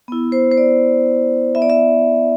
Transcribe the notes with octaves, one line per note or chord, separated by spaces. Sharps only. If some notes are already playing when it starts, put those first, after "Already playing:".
B3 E4
C5
C5
D5
B3 E4 E5
D5
E5